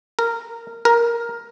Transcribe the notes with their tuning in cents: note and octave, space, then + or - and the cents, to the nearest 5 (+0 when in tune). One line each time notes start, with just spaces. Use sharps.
A#4 -10
A#4 +10